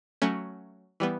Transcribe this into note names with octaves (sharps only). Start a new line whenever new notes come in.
F#3 A3 C#4
E3 G3 B3